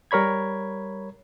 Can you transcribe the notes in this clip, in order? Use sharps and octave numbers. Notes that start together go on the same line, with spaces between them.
G3 A#4 C#5 B5 G#6